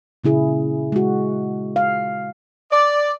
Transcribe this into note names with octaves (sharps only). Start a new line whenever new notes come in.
A#2 C#3 E4 G#4
G#3 F#4
F5
D5